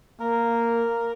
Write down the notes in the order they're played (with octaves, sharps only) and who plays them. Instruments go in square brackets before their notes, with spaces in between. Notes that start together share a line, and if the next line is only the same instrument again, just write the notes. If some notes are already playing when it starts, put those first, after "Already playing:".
[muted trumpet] A#3 [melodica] A#4